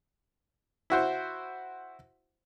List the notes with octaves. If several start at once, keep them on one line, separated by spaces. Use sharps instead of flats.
E4 F#4 C5